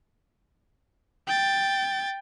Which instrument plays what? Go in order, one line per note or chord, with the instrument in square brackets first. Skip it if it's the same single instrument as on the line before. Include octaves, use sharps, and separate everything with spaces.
[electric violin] G5 A6